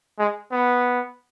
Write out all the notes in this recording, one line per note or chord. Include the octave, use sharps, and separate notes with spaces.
G#3
B3